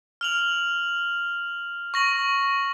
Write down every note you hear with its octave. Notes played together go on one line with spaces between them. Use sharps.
F6 F7 F#7
C#6 A#6 F#7